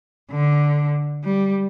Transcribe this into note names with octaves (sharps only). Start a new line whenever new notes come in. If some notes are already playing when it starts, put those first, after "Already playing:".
D3
G3